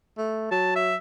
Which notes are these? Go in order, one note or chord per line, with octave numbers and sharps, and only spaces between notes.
A3
F#3 A5
E5